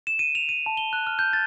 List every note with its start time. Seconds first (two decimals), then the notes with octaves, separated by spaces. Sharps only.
0.07 E7
0.19 D#7
0.35 F7
0.49 D#7
0.66 A5
0.77 G7
0.93 F#6
1.07 F6
1.19 G6
1.33 A6